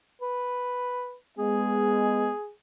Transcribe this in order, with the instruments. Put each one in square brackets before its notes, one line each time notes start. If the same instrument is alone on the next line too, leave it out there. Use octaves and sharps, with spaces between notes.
[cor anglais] B4
[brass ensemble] G#3 B3 [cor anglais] G#4